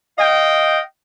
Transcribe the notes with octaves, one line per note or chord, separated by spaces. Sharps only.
D#5 F5 G5